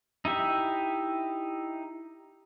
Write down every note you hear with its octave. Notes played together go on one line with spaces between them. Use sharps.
D#4 E4 G4 E5